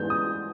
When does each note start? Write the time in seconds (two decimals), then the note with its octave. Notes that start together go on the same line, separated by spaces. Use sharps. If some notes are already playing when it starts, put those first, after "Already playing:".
Already playing: G#2 E3 G3 B3 D#4 G6
0.10 D#6